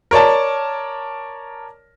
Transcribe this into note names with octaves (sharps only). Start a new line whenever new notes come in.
A#4 C#5 D5 A5